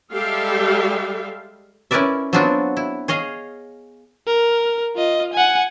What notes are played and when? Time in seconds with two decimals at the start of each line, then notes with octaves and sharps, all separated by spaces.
0.12 G3 G#3 G4 A4 E5 F5
1.91 C#4 E4 A#4 B4 D5 E5
2.33 F#3 B3 C4 D4 F4 F#4
2.77 E4
3.08 G#4 C#5 D#5 F5
4.27 A#4
4.96 F4 D#5
5.33 F#5 G#5